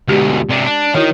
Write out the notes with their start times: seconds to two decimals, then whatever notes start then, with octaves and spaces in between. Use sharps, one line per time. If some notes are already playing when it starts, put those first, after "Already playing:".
0.08 D2 B2 G#3 G4 D5
0.50 C3 D4
0.66 D4
0.94 D#3 E4 F#4 C#5